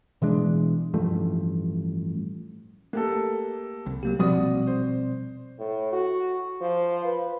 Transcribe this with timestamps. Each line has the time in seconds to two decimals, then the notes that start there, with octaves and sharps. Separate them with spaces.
0.22 B2 E3 G#3 D4
0.94 A1 G2 F3 A3
2.93 A3 A#3 G4 A4
3.86 C2
4.03 F#3 A#3 G4
4.19 A#1 B2 F3 G3 C4 F#4 D5 D#6
4.67 C5
5.59 A2
5.92 F#4
6.61 F3
7.05 B4